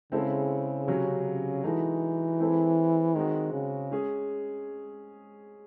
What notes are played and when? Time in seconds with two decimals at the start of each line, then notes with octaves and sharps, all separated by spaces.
0.12 C#3 G#3 C4 E4 A4
0.88 C3 F#3 C#4 F#4
1.63 E3 G#3 D#4 F#4 A4
2.40 G#3 C4 E4 A4
3.15 D#3 G#3 C4 F#4
3.53 C#3
3.91 G#3 C#4 G#4